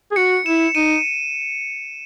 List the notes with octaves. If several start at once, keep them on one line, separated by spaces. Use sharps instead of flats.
G#4
F#4 C#7
E4 E7
D#4 D#7